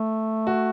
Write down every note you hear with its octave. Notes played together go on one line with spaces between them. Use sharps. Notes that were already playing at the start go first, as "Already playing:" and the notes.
Already playing: A3
F#4